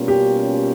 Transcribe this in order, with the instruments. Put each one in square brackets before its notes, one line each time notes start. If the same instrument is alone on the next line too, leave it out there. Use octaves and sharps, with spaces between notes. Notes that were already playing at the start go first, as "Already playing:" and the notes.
Already playing: [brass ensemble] B2 G3 A#3 C#4 F4
[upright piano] G4